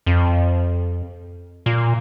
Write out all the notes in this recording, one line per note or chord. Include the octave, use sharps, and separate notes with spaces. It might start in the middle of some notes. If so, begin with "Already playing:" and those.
F2
A#2